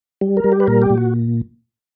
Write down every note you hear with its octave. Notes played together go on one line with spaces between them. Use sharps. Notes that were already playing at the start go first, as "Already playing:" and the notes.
G3
A#4
G3
G4
B4
A#2 A#4
G4
A#2
F#4